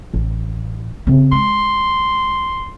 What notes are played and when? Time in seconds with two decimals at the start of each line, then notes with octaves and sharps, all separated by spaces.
0.14 A1
1.07 C#3 C4
1.32 G#3 C6